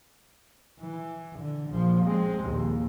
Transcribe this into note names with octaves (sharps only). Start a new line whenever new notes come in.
E3
D3
A#1 F3
G#3 C4
A#1 D#2